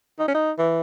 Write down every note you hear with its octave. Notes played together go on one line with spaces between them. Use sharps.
D#4
C#4
D#4
E3